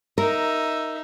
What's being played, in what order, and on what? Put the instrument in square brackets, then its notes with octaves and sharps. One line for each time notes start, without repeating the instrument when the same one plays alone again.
[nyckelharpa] D#4 E5 [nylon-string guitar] A#4